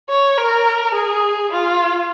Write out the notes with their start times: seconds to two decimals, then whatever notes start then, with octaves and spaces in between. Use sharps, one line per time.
0.10 C#5
0.38 A#4
0.95 G#4
1.52 F4